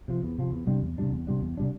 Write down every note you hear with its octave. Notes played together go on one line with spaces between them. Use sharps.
C3 F3
E2
C3 F3
E2
C3 G3 D4
E2
C3 G3 D4
E2
C3 G3 D4
E2
C3 G3 D4